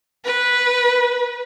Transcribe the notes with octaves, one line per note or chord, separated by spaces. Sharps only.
B4